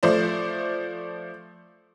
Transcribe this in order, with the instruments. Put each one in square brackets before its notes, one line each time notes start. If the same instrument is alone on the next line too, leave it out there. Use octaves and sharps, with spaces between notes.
[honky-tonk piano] F3 A3 C5 D5